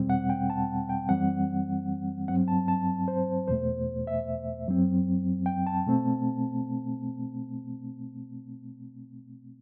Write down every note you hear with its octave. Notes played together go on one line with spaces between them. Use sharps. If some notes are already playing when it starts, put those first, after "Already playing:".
Already playing: E2 B2 G3 C4
F#5
G5
A5
G5
F#2 E3 G3 C4 F#5
G2 F#3 C4 F#5
A5
A5
C5
E2 B2 A3 C5
E5
F#2 F#3 C4
G5
A5
B2 A3 C4